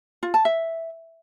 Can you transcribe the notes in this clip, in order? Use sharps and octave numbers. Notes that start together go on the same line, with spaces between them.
F4
A5
E5